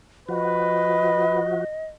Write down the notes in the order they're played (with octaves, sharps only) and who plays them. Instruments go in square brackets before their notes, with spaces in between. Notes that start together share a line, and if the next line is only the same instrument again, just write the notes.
[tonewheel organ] F3 F#4 [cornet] B4 [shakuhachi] D#5